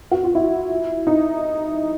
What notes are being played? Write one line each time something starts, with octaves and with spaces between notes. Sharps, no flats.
F#4
F4
E4
D#4